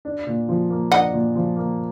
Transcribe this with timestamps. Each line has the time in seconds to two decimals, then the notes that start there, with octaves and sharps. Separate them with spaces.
0.05 D4
0.27 A#2
0.49 F3
0.70 A#3
0.92 D4 D#5 F#5
1.13 A#2
1.36 F3
1.57 A#3